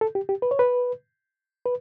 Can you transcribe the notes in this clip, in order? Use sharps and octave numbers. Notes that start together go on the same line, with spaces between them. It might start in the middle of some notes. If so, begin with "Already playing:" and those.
A4
G4
G4
B4
C#5
B4
B4